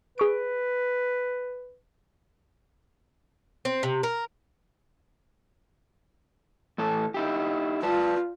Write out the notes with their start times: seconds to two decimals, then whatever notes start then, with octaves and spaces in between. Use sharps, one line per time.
0.18 G#4 B4 C#6 D7
3.65 C4
3.83 C3
4.03 A#4
6.78 A2 E3 A4
7.14 D#4 E4 G4
7.83 F4 B4 D5 A5